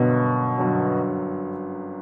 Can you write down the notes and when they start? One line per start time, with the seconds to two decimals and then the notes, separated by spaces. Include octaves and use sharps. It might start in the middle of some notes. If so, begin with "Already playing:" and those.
Already playing: G1 F#2 B2 D3 F#3
0.58 G1 F#2 D3 F#3